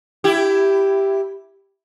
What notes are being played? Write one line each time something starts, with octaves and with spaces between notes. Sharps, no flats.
E4 G4